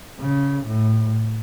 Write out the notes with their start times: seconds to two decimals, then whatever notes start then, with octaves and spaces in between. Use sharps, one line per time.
0.20 C#3
0.67 A2